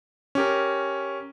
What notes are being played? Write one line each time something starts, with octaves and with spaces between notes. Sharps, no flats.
C#4 G4 A#4